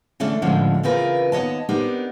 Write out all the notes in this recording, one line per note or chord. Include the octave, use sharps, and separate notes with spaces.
D3 E3 A3 C#4 D4
A2 D3 F3 G#3 C#4
C#3 E3 C4 F4 A#4 B4
D#2 B3 C#5 D#5 A5
B3 C4 D4 D#4 G4 A#4